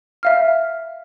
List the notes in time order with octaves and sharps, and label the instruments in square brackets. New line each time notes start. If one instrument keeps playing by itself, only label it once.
[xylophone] E5 F5 F6